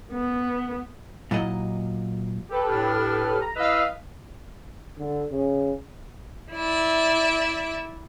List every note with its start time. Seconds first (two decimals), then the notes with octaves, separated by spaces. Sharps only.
0.13 B3
1.31 A#2 F#3 E4 D#5
2.49 G4 A4 B4
2.68 A2 D4 F6
3.41 A#5
3.56 E4 B4 D#5 F5 E6
4.98 D3
5.31 C#3
6.54 E4 D5 E5